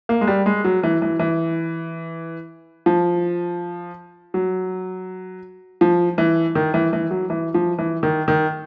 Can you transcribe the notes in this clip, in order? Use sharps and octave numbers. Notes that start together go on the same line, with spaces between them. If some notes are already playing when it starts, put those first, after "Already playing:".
A#3
G#3
G3
G#3
F#3
E3
E3
E3
F3
F#3
F3
E3
D#3
E3
E3
F#3
E3
F3
E3
D#3
D#3